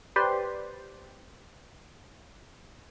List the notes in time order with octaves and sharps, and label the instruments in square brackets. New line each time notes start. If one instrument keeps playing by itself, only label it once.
[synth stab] G4 B4 C5 D5 C6